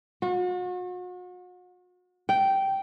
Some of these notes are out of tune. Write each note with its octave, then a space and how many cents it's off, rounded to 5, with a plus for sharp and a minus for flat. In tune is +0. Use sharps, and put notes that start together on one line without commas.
F#4 -40
G5 -10